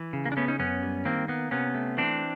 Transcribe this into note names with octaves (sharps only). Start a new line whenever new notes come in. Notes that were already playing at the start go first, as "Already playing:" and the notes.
Already playing: E3
C#3
A#3
D4
A3 B3 C#4
C#4 D#4
F#2 B3 C#4
G3
D#3 A#3 C4
A#3 B3
C3 B3 C#4
A3
E3 C4 D4